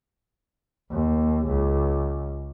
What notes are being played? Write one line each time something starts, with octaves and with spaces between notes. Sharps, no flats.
D#2
C#2